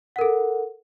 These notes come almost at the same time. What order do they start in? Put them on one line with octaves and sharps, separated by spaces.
F#5 A#4 A4